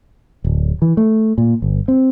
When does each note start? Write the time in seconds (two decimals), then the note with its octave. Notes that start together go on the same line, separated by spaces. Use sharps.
0.44 D1
0.82 E3
0.97 A3
1.38 A#2
1.62 G1
1.88 C4